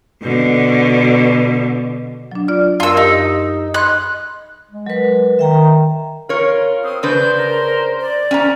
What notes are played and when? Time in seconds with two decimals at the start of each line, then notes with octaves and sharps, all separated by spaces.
0.22 B2 D3
2.32 F#3 D4
2.48 F4 D5
2.80 F#2 F4 A#4 E6
2.97 D#4 G4
3.74 D#5 B5 C6 F#6
4.71 G#3
4.86 F#3 A#4 B4
5.39 D#3 E5 G5 A#5
6.29 F4 A#4 C#5
6.84 C4 D#6
7.03 C#3 D4 B4 C5 G6
7.38 A#4
8.01 D5
8.31 C#4 G#5 A#5